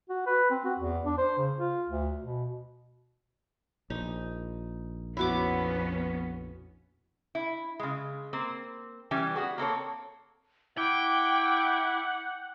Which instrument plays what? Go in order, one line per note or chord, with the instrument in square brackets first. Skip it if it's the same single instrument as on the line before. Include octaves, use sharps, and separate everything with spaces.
[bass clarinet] F#4
B4
C4
F#4
E2
D4
C5
C#3
F4
D2
B2
[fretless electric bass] A#1 [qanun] D#4
[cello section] F2 B3 C#4 [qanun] E4 F#4 D6
[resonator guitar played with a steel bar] E4
C#3 G#3
A#3 C4
E3 G3 C#4 B4 G#5
B3 F#4 G#4
A#3 C4 A4 C#5
[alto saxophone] E4 [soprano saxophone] F#5 [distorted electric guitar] G5 [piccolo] D6